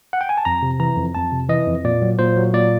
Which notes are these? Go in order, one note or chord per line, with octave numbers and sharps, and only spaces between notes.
F#5
G5
G#5
A5
F2 A#5
C3
E3 A#5
F2
F2 A5
C3
E3 D#5
F2
A#2 D5
F#3
A#2 C5
F#3
A#2 D5